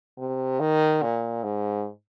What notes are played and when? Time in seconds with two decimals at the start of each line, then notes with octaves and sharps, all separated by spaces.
0.18 C3
0.60 D#3
1.02 A#2
1.43 G#2